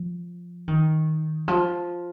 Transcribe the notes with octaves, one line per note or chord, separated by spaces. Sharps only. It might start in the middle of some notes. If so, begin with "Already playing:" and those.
Already playing: F3
D#3
F3